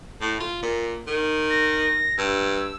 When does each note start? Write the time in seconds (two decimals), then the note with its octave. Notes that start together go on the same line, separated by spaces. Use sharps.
0.21 A2
0.40 F4
0.63 A#2
1.08 D#3
1.50 A#6
2.18 G2 E6